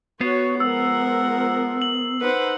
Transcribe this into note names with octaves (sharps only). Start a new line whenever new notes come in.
B3 F#4 C#5 C7
F3 G#3 A#4 F#5 E6
F#7
D#4 B4 C5 F#5